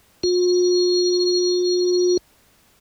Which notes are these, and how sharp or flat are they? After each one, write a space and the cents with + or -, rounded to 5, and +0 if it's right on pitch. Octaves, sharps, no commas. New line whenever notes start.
F4 +45